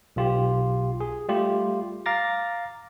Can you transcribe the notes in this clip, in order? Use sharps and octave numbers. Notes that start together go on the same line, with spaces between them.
B1 F4 G4
G#4
G3 A3 F4 G4
F5 A#5 D6 A6 A#6